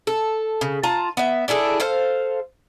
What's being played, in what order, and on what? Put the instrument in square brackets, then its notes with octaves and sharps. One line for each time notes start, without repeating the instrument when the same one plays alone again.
[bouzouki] A4
C#3
F4 A5 A#5
B3 E5
D4 E4 G#4 A4
A4 C5 F5